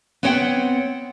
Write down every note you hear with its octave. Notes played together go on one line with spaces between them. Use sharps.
B3 C4 C#5 F#5 G5